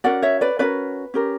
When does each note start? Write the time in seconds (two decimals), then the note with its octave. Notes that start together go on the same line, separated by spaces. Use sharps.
0.04 C#4 F#4 A#4 D5 F#5
0.22 C#5 E5
0.41 B4 D5
0.59 C#4 F#4 A#4 B4 D5
1.14 C#4 G4 A#4